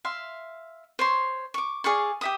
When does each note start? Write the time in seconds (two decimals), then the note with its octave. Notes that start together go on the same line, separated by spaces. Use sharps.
0.05 E5 F5 C6
0.99 C5 C#5 C6
1.54 C#6 D6
1.84 G#4 D5 F5 C#6
2.21 G4 E5 D#6